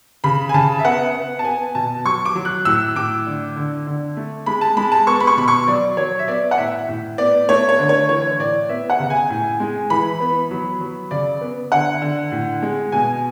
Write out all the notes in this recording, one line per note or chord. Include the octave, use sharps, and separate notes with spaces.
C#3 B5
G#5
C#3 A5
E5
B3 F#5
B3
A5
B3 G#5
B2 A5
F#3 C#6
D6
F#3
F#6
A2 E6
A2 D6
D3
D3
D3
A3
G#3 B5
A5
G#3 B5
A5
B3 C#6
B5
C#6
B2 B5
C#6
F#3 D5
F#3 C#5
E5
B3 D5
F#5
A2 E5
A2
B3 D5
A3 C#5
C#5
D3
C#5
E3 C#5
A2 D5
B3 E5
F#5
C#3
G#5
A2
G#3
E3 B5
B3
F#3
F#3
C#3 D5
B3
D3 F#5
D3
A2
G#3
B2 G#5